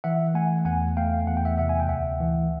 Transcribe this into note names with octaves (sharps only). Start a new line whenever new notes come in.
E3 E5 F#5
A3 F#5 G#5
E2 F#5 G#5
A3 F5 G5
E2 F#5
G5
E5 F#5
C3 E5 F#5
G#5
G5
D2 E5 F#5
E3